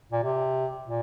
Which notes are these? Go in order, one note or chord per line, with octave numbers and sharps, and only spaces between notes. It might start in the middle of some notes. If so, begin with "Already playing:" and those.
A#2
C3
A#2